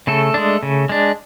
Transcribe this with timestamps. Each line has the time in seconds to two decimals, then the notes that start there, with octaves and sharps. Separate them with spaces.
0.07 C#3 A3 A4
0.34 G#3 D4
0.63 C#3
0.89 G#3 D4